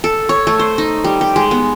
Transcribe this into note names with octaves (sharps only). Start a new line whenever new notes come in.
A4
C#5
A3
C5
D#4
G3
G4
G#3
B3